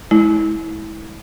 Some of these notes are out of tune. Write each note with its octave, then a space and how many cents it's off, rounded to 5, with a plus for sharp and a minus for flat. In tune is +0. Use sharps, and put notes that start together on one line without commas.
G#3 +35 E4 -25